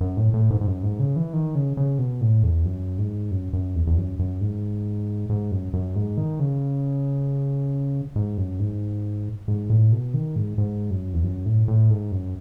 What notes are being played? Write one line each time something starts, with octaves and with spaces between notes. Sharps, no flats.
F#2
A2
A2
G#2
G#2
F#2
G#2
C#3
E3
D#3
C#3
C#3
B2
A2
E2
F#2
G#2
F#2
F#2
E2
E2
F#2
F#2
G#2
G#2
F#2
F#2
G#2
D#3
C#3
G#2
F#2
G#2
G#2
A2
B2
D#3
G#2
G#2
F#2
E2
F#2
A2
A2
G#2
F#2